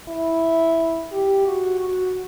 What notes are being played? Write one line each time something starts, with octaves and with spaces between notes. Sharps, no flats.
E4
G4
F#4
F#4